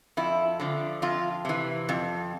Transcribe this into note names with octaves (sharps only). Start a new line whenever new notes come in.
F2 E4
D3 F3
F2 F4
C3 E3
F2